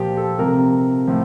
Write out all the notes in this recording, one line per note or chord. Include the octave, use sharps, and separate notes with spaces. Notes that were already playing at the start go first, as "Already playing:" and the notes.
Already playing: A#2 F3 G4
A4
C3 F3 A#4
A2 F3